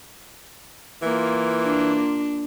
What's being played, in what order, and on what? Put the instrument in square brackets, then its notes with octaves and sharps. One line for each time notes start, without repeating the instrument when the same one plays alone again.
[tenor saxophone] E3 [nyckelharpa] A#3 F4
[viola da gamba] D4